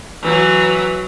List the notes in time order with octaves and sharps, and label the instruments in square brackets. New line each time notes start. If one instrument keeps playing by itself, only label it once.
[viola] E3 F#3